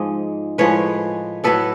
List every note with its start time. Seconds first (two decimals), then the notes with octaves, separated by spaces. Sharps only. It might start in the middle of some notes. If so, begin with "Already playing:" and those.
Already playing: G#2 F3 G#3 D#5
0.58 A2 F3 G#3 B4 C#5
1.44 A2 F#3 A4 B4